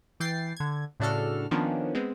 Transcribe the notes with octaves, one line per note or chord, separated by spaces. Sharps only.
E3 G5 A6 C7
D3 G#6
A2 C#3 D4 F#4 A4 F6
D#3 F3 A#3 B3 C#4 D4
G#3 B3 C4